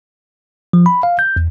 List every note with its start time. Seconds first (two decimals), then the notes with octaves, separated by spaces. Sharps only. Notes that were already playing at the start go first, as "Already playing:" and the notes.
0.73 F3
0.86 B5
1.03 F5
1.19 G6
1.36 E2